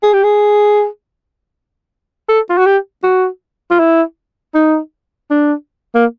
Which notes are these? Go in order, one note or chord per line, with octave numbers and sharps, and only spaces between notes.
G#4
G4
G#4
A4
F4
F#4
G4
F#4
F4
E4
D#4
D4
A#3